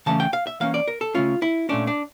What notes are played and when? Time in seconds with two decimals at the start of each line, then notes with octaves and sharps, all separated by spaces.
0.06 C#3 E3 A3 C#4 A5
0.20 G5
0.33 F5
0.47 E5
0.60 E3 A#3 C#4 F5
0.74 D5
0.88 A#4
1.01 A4
1.14 C#3 E3 A3 C#4 F4
1.42 E4
1.69 A#2 A3 C#4 D4
1.87 D4